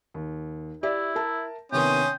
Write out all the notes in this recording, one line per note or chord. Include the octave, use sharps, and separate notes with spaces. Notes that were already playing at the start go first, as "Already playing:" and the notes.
D#2
E4 G4 D5 E5
A#4 E5 A5
C3 D#3 B3 C#4 G5 C6 D#6